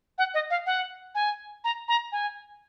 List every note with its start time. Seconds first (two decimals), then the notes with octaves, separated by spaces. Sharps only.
0.18 F#5
0.34 D#5
0.50 F5
0.66 F#5
1.15 G#5
1.64 A#5
1.88 A#5
2.12 G#5